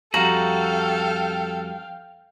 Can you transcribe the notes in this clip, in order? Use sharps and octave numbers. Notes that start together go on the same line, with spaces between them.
F2 G3 F#4 A4 F5 G5 A#5